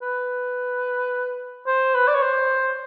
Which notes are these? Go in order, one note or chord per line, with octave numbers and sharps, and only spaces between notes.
B4
C5
B4
D5
C#5
C5